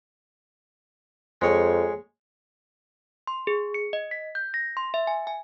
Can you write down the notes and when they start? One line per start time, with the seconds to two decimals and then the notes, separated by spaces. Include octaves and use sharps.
1.42 F2 G#3 C#5 G#5
3.27 C6
3.47 G#4
3.74 C#7
3.93 D#5
4.11 B6
4.35 G6
4.54 A#6
4.77 C6
4.94 E5
5.07 G#5
5.27 G#5